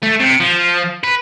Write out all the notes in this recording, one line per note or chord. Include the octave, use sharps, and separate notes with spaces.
A3
C3
F3
B4